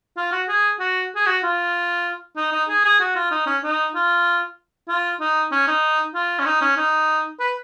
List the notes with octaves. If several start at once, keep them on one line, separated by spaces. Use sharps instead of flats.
F4
F#4
G#4
F#4
G#4
F#4
F4
D#4
D#4
G#4
G#4
F#4
F4
D#4
C#4
D#4
F4
F4
D#4
C#4
D#4
F4
C#4
D#4
C#4
D#4
B4